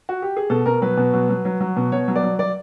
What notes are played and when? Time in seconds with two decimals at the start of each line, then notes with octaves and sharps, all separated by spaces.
0.09 F#4
0.22 G4
0.37 G#4
0.50 B2 A4
0.66 B2 A#4
0.82 F#3 B4
0.97 B2
1.13 F#3
1.29 F#3
1.45 F#3
1.60 F#3
1.76 B2
1.92 B2 C#5
2.08 F#3
2.16 D5
2.23 F#3
2.39 F#3 D5